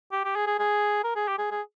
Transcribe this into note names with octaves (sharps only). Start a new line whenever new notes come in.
G4
G4
G#4
G#4
G#4
A#4
G#4
G4
G#4
G#4